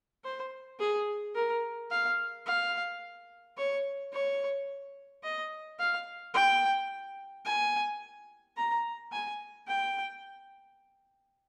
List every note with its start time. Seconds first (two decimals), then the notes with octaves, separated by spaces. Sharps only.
0.24 C5
0.80 G#4
1.35 A#4
1.90 F5
2.46 F5
3.57 C#5
4.13 C#5
5.23 D#5
5.79 F5
6.34 G5
7.45 G#5
8.57 A#5
9.12 G#5
9.67 G5